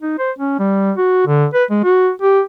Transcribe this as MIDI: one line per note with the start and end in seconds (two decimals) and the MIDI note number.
0.02 0.14 63
0.19 0.31 72
0.39 0.55 61
0.59 0.92 55
0.97 1.22 66
1.27 1.46 50
1.54 1.64 71
1.71 1.80 56
1.84 2.10 66
2.22 2.42 67